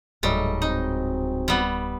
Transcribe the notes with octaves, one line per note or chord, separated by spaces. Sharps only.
D1 G#2 F#3 G3 A3 D#5
C4 D#4
G3 B3